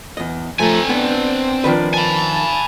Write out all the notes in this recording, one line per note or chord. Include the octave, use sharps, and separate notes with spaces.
E2 D#5
F3 A3 C4 G#5 A#5
B3 D4
D#3 F3 D4 B4
G#5 A5 B5